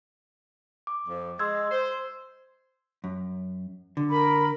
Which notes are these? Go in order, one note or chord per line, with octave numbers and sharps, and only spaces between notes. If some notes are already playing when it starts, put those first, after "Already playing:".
D6
F2
G#3 C6 E6 G#6
C5
F#2
D3
A#4 B5